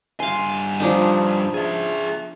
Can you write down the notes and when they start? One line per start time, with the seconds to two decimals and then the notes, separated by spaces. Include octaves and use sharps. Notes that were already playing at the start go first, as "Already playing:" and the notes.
0.20 G2 F5 G#5 C6
0.80 F3 D4 D#4
1.54 G#4 E5